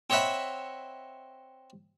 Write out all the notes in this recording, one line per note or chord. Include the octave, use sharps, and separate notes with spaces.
C4 C#5 D#5 E5 F#5 B5